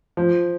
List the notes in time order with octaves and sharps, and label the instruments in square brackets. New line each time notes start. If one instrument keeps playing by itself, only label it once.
[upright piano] F3